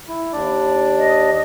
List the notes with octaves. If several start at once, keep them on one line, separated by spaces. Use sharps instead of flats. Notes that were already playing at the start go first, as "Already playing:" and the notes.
E4
D#2 D4 D5
D#5